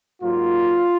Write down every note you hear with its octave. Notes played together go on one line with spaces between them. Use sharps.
G#2 F#3 A#3 F4